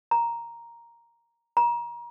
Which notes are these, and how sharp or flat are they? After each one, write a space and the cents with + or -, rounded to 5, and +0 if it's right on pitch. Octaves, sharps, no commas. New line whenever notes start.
A#5 +5
A#5 +30